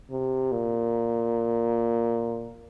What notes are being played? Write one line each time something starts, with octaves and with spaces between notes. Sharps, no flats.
C3
A#2